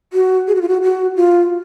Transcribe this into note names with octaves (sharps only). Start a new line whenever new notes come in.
F#4
G#4
F#4
F4
F#4
F#4
F4